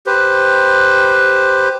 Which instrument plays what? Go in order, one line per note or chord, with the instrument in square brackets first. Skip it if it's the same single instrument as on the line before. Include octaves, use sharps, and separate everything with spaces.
[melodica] G4 B4 C5